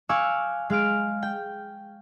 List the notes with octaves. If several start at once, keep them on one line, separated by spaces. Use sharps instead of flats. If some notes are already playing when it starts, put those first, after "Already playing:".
F5 G#5 C#6 D6 E6 F#6
G#3 F5 F6 D7
G5